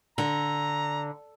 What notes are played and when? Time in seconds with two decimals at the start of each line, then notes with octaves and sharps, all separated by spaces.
0.18 D3 A#5